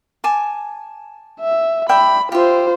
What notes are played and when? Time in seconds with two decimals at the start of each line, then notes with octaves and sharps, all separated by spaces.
0.24 G#5 A5 D6
1.40 E5
1.89 D5 E5 G5 B5
2.32 F4 G4 C5 E5